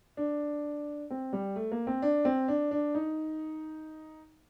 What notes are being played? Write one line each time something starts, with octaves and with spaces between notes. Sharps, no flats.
D4
C4
G3
A3
A#3
C4
D4
C4
D4
D4
D#4